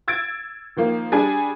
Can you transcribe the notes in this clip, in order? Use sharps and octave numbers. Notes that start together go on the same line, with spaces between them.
E6 G#6 A6 D7
D#3 F3 A#3
G3 D4 G#4 G#5